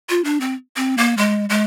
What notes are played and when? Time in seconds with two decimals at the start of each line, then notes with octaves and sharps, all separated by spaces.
0.10 F4
0.24 D4
0.41 C4
0.76 C4
0.98 A#3
1.17 G#3
1.50 G#3